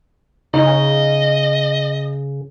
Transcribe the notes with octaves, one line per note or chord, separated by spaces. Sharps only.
C#3 D#4 D#5